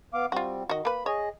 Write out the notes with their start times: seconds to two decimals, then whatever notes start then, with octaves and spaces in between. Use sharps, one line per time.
0.14 B3 F5 D6
0.32 G3 C4 F4 F#4
0.69 D#3 F#4 D#5
0.85 A#3 B4 B5
1.06 G#4 C#5 D#5